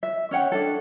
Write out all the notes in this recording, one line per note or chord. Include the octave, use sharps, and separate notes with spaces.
E5
C#4 C#5 F#5 G5
D4 A4